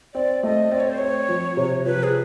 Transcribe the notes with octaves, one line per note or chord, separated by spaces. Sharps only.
C4 D5
A3 D#5
C4 D5
C#5
C5
C4 C#5
F3
C3
F3 B4
G#4